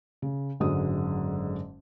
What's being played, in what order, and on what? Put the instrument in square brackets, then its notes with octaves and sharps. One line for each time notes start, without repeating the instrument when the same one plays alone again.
[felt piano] C#3
F#1 G#2 D3 F#3 G#3 D#6